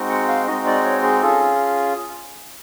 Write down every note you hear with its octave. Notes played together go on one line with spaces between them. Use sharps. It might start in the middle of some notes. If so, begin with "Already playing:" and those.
Already playing: G#3 C4 D#4 F#4
F#5
F5
G#3 C4 D#4 F#4 D#5
D5
C#5
G#4
C#4 F4 G#4 A4